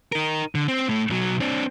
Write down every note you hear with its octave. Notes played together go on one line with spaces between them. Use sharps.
D#4 A#4
D3
C4
A2 A3
B1 F#3
C4 D4